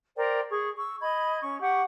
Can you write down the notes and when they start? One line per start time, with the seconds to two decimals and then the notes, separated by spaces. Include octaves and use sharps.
0.16 A#4 C5 D5 G5
0.50 G#4 C#6
0.76 C#6 E6
1.01 D#5 B5 G#6
1.42 C#4 C#6
1.61 G4 F#5 C#6